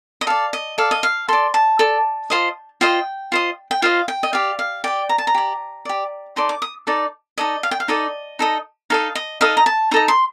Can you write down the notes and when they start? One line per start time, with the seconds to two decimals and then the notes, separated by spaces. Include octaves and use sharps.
0.21 D#5
0.27 A4 D5 F5
0.53 D#5
0.78 A4 D5 F5
0.91 D#5
1.03 F5
1.28 A4 D5 C6
1.54 A5
1.79 A4 D5
2.30 F4 C5 D#5
2.81 F4 C5 D#5 G5
3.32 F4 C5 D#5
3.71 G5
3.82 F4 C5 D#5 F5
4.08 G5
4.23 D#5
4.33 G4 D5 F5
4.59 F5
4.84 G4 D5 G5
5.09 A#5
5.18 A5
5.27 A#5
5.35 G4 D5
5.85 G4 D5
6.36 D#4 A4 D5 C6
6.49 D6
6.62 D#6
6.87 D#4 A4 D5
7.38 D#4 A4 D5 D#5
7.63 F5
7.71 G5
7.80 F5
7.88 D#4 A4 D5 D#5
8.39 D#4 A4 D#5
8.90 D#4 A4 D#5 F5
9.15 D#5
9.41 D#4 A4 D#5 F5
9.57 A#5
9.66 A5
9.91 D#4 A4 D#5 A#5
10.08 C6